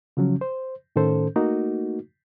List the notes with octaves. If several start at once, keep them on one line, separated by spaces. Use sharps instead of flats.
C#3 F3 F#3 C#4
C5
A2 D#3 C#4 A4 C5
A3 A#3 D#4 F#4